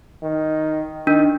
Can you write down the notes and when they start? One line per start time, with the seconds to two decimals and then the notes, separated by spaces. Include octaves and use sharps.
0.23 D#3
1.07 D#3 D4